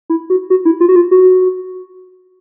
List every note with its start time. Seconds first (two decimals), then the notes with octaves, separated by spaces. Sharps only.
0.10 E4
0.30 F#4
0.50 F#4
0.65 E4
0.80 F4
0.89 F#4
0.96 F4
1.11 F#4